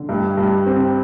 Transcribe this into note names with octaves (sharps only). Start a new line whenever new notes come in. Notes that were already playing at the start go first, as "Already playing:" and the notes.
Already playing: D3
G2
G2
C4